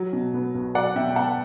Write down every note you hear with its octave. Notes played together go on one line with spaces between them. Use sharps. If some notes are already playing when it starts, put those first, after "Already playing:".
Already playing: F#3
B2
B3
B1
F#3 D5 F#5
B2 E5 G5
G5
B3 F#5 A5